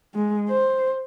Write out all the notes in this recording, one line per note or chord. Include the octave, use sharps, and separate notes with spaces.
G#3
C5